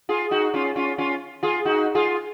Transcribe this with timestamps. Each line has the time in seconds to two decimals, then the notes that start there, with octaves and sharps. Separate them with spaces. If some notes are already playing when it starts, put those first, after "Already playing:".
0.09 F4 G#4
0.31 D#4 F#4
0.54 C#4 F4
0.76 C#4 F4
0.98 C#4 F4
1.43 F4 G#4
1.65 D#4 F#4
1.95 F4 G#4